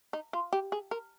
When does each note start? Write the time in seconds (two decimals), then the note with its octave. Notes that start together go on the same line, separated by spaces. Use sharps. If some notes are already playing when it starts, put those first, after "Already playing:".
0.13 D#4
0.33 F4
0.53 G4
0.72 G#4
0.91 A#4